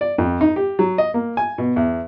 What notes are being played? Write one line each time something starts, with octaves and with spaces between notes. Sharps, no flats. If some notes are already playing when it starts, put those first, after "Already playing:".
D5
F2
D#4
G4
F#3
D#5
A#3
G#5
B2
E2